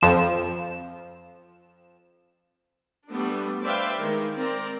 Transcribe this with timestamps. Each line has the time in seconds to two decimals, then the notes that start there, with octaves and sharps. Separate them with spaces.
0.01 F2 F3 E7
3.08 G3 A3 B3 D4
3.62 B4 C5 D5 E5 F5 G5
4.00 D#3 G#3
4.37 C4 A#4 D5